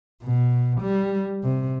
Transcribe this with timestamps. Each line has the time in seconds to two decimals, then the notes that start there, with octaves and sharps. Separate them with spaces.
0.23 B2
0.81 G3
1.43 C3